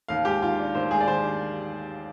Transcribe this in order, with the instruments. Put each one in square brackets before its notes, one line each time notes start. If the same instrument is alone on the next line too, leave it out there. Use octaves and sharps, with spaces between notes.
[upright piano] D#2 F5
G#3 G4
D#3 F4
D4
D#2 C5
G#3 G#4
D5
D#3 C5
D4